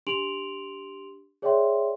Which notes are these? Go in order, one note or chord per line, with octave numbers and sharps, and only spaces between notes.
D4 G4 C6 D7 F7 F#7
G#4 C#5 D5 E5 G5 C6